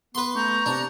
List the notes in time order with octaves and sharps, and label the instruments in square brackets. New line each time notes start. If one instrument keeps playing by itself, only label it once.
[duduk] B3 [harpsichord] B4 C6
[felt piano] A3 [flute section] A#5 C#6 G6
[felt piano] C3 [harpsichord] D4